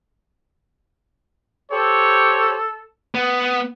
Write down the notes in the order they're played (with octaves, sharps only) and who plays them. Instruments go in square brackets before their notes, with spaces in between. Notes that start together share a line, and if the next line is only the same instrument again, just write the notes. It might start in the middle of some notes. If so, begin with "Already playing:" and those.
[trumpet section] G4 C5 C#5 [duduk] A4
[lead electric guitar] B3